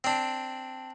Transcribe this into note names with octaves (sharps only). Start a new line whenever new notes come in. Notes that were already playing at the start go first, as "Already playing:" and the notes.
C4 D4